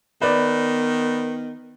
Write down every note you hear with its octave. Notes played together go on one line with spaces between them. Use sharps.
D#3 B3 B4 D5